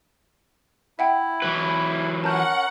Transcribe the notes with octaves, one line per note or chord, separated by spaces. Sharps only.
E4 E5 F#5 G5
E3 F#3 B4
C#4 A#4 F#5 A5 G6